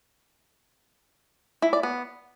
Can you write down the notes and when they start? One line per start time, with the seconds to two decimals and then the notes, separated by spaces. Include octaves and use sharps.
1.62 E4
1.73 D5
1.83 B3